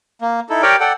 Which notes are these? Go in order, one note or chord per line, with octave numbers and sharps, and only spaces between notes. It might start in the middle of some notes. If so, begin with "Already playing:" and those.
A#3
D#4 E4 A4
G4 A#4 C#5 D5 G5
A4 D5 F#5 G5